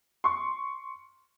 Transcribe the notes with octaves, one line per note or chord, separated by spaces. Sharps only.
C6 C#6